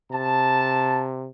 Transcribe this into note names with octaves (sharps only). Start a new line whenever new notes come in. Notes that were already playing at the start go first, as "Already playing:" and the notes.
C3 A5